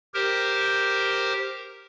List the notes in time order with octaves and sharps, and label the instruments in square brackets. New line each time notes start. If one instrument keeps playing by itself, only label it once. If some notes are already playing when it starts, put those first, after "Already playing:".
[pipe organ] G4 A#4 C5